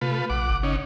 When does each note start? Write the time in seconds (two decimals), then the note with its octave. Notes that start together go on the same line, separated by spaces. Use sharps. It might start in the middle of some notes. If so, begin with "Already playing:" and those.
0.01 C3 A3 F4 B4
0.30 A#1 F#5 D6
0.49 G1
0.63 C#3 C#4 D#4